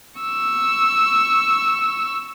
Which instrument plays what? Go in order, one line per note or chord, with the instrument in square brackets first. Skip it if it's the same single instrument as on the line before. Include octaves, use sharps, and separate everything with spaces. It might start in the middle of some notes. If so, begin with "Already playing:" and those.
[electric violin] C#6 E6